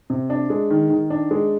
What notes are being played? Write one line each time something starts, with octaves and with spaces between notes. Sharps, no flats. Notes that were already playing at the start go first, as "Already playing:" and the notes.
C3
D4
G#3
D#3
D#3
D4
G#3